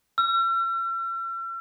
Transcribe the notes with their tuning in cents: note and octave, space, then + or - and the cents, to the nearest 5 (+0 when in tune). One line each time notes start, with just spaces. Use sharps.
E6 +45